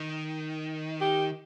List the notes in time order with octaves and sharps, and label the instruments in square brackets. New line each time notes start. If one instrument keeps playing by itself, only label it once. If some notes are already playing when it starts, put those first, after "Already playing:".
Already playing: [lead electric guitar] D#3
[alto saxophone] G4